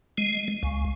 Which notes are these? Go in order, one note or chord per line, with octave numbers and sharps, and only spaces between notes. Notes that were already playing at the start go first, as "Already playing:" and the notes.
G#3
C#2